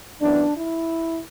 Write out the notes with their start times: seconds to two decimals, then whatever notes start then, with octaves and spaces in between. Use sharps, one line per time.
0.20 F#2 E3 B3 D4
0.56 E4